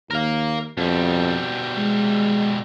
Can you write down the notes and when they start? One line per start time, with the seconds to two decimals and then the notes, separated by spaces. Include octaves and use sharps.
0.11 D#2 A#4 F5
0.77 F2 B2 G3
1.77 G#3